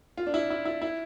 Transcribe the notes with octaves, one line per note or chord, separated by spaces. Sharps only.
F4
D4
E4
E4
E4
E4